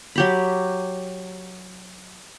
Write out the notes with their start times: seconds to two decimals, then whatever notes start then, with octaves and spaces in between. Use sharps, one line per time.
0.16 F#3 G4 B5